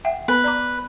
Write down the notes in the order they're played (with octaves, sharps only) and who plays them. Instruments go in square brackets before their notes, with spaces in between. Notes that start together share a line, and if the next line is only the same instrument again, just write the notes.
[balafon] E5 F#5 G5
[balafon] B3 [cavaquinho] B4
[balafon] D5 A#5 D6